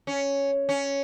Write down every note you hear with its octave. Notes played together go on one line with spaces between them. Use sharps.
C#4
C#4